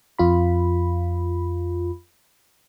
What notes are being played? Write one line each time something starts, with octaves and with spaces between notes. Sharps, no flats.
F2 F4 B5